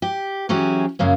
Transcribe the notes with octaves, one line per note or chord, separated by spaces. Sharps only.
G4
E3 F#3 C#4 G4 G#4
F#2 C#3 A#3 C#4